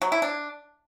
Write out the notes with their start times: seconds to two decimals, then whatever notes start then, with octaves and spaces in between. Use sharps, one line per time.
0.02 F#3
0.12 E4
0.22 D4